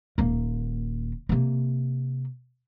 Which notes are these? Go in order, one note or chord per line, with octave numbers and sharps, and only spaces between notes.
D#1 A#3
C3 A#3